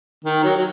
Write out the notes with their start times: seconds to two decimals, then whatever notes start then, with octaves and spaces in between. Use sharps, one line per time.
0.25 D#3
0.44 F#3
0.57 F#3